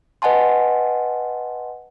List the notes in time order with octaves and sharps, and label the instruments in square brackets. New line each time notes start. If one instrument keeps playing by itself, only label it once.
[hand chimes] B4 D#5 F#5 G#5 A5 C6